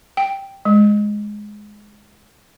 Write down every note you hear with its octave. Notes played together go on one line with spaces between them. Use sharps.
G5
G#3